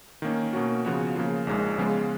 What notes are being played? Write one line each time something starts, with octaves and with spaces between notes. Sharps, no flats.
D#3 A#3 C#4
B2 A#3 C#4 F#4
C#3 F3 B3 F#4 C#5
C#3 F3 A#3 F4
A#1 A#2 G#3 D#4
C#3 F3 G#3 B3 F4